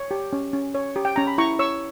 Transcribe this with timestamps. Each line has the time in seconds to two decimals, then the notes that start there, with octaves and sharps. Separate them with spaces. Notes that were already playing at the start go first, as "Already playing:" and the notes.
Already playing: C#5
0.11 G4
0.33 C#4
0.53 C#4
0.75 C#5
0.96 G4
1.05 G5
1.16 C#4 A#5
1.27 B5
1.38 E4 A#5 C#6
1.59 C#5 C#6 E6